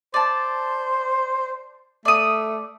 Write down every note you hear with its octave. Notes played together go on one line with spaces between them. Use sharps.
C5 D5 A5
A3 D5 D#6